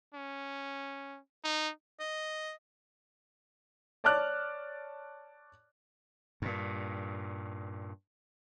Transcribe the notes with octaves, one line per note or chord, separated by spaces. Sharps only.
C#4
D#4
D#5
C#5 D5 A5 D6 F6 F#6
G2 A#2